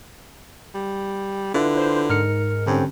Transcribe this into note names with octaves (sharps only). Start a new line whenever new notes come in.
G3
D3 E4 F4 B4
C5
G#2 A#4 F6 C#7
G2 D3 C4 C#4